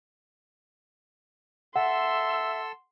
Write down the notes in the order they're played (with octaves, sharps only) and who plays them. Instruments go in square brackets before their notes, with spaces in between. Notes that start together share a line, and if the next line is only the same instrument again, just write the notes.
[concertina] A4 E6 [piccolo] E5 [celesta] F#5 [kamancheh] C6